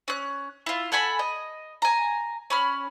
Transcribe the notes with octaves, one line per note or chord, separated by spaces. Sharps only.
C#4 F#6
E4 F4
A4 F#5 G#5 B5
D#5
G#5 A#5
C#4 B5 F6